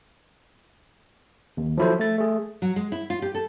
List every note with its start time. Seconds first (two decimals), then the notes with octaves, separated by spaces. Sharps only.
1.57 D#2
1.78 F3 F#3 E4 A4 C5
1.99 A3 A6
2.18 A3 G#4
2.62 F#3
2.76 G#3
2.92 E4
3.10 F4
3.22 G4
3.35 A4